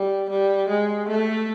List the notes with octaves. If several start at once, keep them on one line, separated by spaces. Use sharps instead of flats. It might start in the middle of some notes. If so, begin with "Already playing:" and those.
Already playing: G3
G3
G#3
A3